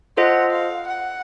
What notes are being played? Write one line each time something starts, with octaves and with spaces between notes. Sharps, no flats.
F4 A4 C5 D#5 F#5
F5
F#5